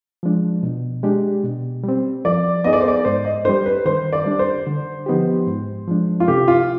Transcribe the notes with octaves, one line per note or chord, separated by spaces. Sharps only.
F3 G#3 D4
B2
G#3 D4 G4
B2
G3 C4
F3 D5
B3 D#4 G#4 D#5
D5
C5
D5
G#2 C5
D#5
G3 D4 C5
B4
D#3 C5
D5
G3 D4
C5
D3
F3 B3 D#4 G4
G#2
F3 G#3 D4
F4
C3 G4
F4